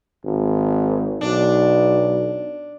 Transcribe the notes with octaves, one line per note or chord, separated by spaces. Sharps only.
G#1
B1 D4